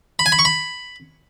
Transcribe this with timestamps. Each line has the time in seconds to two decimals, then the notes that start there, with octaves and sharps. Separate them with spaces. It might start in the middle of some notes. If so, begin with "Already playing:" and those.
0.19 B5
0.26 G#5
0.32 B5
0.39 C#6
0.45 B5